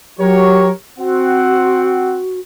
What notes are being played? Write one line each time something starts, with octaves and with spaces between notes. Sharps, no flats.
F#3 G4 A#4 C#5
C4 F#4 F#5